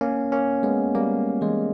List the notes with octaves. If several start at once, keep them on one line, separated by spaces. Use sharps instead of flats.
A#3 C#4
A#3 C#4
G#3 B3
G3 A#3
E3 G#3